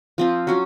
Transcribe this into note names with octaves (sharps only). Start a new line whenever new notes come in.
F3 C4 F4
F#3 C#4 F#4